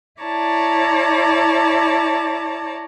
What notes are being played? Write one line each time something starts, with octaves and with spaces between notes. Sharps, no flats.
E4 C#5 D5 A5 A#5